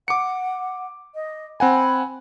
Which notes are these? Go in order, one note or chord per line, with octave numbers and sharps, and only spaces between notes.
F#5 D6 C#7
D#5
C4 F#5 G#5 B5